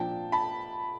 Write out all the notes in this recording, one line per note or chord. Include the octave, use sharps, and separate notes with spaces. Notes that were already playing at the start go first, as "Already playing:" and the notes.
Already playing: A#2 F3 A#3 D4 G5 A5
A5 B5